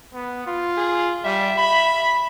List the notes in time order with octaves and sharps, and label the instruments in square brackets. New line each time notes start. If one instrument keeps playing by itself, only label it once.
[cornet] B3
F4
[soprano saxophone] G#4
[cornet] G3 [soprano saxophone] E5
[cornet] B5